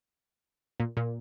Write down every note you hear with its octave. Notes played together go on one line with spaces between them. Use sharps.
A#2
A#2